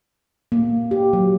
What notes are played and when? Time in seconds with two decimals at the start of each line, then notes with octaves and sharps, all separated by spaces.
0.52 A#3
0.91 G4
1.13 F#3